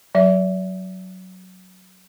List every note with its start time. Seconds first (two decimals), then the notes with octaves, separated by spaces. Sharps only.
0.15 F#3 E5